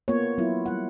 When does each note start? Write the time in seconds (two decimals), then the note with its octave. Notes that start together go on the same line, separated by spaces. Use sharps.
0.08 A#3 B3 F4 C#5
0.38 F#3 B3 E4 F4
0.66 G3 F#5